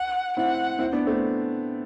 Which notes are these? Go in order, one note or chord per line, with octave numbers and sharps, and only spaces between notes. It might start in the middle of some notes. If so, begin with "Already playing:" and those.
Already playing: F#5
C4 E4 F#5
C4 E4
B3 D4
A3 C4